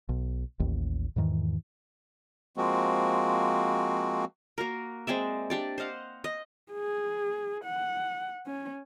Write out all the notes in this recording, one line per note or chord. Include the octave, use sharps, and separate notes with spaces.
B1
A1 D#2
E2 G#2 D#3 E3
F3 G#3 A#3 C4 F#4
A#3 F#4 A#4
G#3 C4 D5 E5
D4 G4 D5
C5 D#5 F5 F#5
D#5
G#4
F#5
C#4